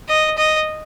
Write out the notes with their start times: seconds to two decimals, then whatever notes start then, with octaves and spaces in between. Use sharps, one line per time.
0.09 D#5
0.38 D#5